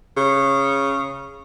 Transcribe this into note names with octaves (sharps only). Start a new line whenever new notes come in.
C#3